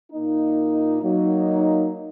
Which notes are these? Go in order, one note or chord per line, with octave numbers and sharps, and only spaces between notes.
A#2 A#3 D#4
F#3 A#3 D#4